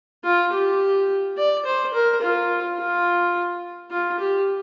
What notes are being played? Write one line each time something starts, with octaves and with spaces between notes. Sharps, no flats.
F4
G4
D5
C5
A#4
F4
F4
F4
G4